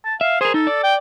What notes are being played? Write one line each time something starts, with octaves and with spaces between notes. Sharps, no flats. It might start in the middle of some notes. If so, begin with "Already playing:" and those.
A5
E5 F5
G#4 A#4 C5
D#4 A4
D5
G5